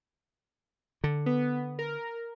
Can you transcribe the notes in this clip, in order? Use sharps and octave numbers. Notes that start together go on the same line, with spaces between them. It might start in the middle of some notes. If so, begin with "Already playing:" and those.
D3
B3
A#4